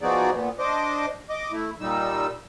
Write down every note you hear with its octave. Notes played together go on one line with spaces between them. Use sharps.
F3 B3 D#4 F#4 G#4 D5
A#2 B3
D4 C5 D#5 D6
D#5 D6
A3 E4
A#2 G3 D#4 E6